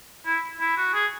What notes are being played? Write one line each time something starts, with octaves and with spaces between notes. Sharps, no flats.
E4
E4
F#4
G#4